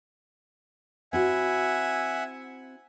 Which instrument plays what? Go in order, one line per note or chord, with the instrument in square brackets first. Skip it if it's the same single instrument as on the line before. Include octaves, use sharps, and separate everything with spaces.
[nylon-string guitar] C4 E4 F#4 [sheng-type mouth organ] E5 F#5 G#5